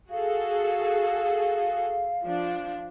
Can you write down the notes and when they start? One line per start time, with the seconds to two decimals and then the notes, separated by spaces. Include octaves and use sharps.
0.10 F#4 G#4 A4 F5
2.23 F3 D4